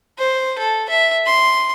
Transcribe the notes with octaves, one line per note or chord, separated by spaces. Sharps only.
C5
A4
E5
C6